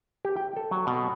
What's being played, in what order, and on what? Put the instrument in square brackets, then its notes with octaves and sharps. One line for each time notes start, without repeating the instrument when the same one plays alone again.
[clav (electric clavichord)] G4
G5
A4
F#3
B2